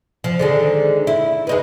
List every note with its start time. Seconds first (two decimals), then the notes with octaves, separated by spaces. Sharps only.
0.24 F3
0.39 D3 D#3 G#3
1.07 E4
1.47 G#3 D#4 B4